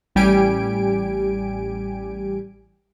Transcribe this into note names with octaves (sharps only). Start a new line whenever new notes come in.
A1 G3 G4 G#5 D7